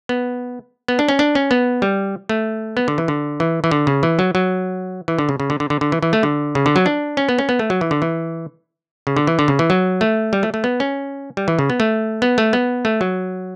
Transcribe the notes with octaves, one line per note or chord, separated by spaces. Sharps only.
B3
B3
D4
C#4
D4
C#4
B3
G3
A3
B3
D3
E3
D3
E3
E3
D3
C#3
E3
F#3
F#3
E3
D3
C#3
C#3
D3
D3
D3
D3
E3
E3
A3
D3
C#3
D3
F#3
D4
C#4
B3
C#4
B3
A3
F#3
E3
D3
E3
C#3
D3
E3
D3
C#3
E3
F#3
A3
G3
A3
A3
B3
C#4
G3
E3
C#3
B3
A3
B3
A3
B3
A3
F#3